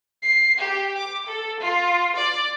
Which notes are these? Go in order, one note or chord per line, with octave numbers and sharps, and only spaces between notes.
C7
G4
D6
A4
F4
D5